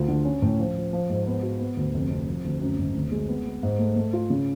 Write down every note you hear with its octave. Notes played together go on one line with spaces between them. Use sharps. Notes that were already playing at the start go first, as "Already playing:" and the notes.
Already playing: D2 F4
D3
C#4
A2
F3
F3
F3
G#2
B3
F#4
B3
D2
F1
F2
F3
D2
F#2
G#1
D2
G#3
B3
B3
G#2
A3
A3
F4
C#3